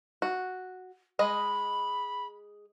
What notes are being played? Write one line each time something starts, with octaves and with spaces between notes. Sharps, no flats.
F#4
G#3 D#5 B5